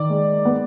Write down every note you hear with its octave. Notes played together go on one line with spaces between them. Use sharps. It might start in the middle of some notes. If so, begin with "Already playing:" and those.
Already playing: D#3 D5
G#3
B3